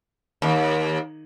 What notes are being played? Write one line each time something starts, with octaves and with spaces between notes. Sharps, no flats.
D#2